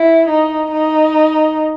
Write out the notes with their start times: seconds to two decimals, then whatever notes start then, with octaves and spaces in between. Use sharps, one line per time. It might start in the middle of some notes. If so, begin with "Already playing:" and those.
Already playing: E4
0.29 D#4
0.71 D#4